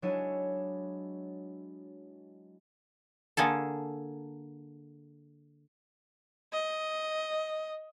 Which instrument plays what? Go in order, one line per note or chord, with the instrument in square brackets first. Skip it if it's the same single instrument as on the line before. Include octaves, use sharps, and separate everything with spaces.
[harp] F#3 G#3 D4 E4 C#5 D#7
[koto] D3 A#3 G#4 A4
[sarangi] D#5